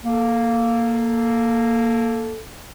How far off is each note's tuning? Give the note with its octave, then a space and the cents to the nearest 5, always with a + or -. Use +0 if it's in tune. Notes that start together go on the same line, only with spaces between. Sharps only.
A#3 +0 A4 +0